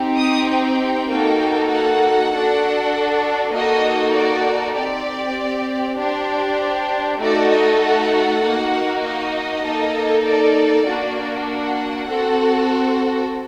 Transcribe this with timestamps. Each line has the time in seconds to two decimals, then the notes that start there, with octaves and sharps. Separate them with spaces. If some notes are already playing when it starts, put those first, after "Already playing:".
Already playing: C4 D#4 G4
0.17 D#6
0.48 G5
1.09 A#3 D#4 F#4 A4
1.70 F#5
2.31 D4 F#4 A4
3.54 A#3 D#4 F#4 A4 D#5
4.15 D5
4.75 C4 G4 D5
5.98 D4 G4 C5
7.20 A3 D#4 F#4 A4 D5
7.51 D#5
7.81 F#5
8.42 A#3 D#4 F#4
9.03 D#5
9.64 A#3 D#4 A4
10.24 D5
10.85 A#3 D4 F#4
11.47 F#5
12.08 C4 F#4 A4